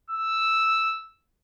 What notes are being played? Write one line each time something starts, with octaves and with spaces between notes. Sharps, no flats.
E6